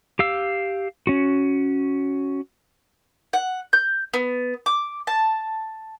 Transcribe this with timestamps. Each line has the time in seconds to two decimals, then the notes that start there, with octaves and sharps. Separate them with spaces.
0.19 G4 F5 E6
1.07 C#4 F#4
3.33 F#5
3.73 G6
4.14 B3
4.66 D6
5.07 A5